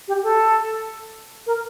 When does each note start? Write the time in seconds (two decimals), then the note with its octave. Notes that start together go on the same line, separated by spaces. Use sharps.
0.08 G4
0.23 A4
1.47 A#4